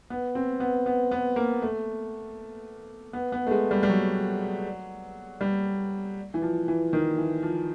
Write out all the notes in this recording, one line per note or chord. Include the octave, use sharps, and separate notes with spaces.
B3
C4
B3
B3
B3
A#3
A3
B3
B3
A3
G#3
G3
G3
F#3
G3
E3
F3
E3
D#3
E3
F3